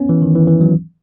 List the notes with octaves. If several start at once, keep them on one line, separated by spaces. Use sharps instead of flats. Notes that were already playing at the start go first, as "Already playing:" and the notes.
Already playing: B3 C#4
E3
D#3
E3
E3
F#3